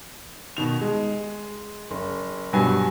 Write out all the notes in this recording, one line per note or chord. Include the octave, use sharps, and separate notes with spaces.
B2 D#3 F7
G#3
F#1
G2 B2 F#3 G3 B3 G#5